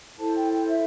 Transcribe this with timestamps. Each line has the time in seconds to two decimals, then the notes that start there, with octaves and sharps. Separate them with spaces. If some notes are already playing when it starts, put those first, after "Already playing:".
0.17 E4 A4 C5 A5
0.34 G5
0.51 G5
0.67 E5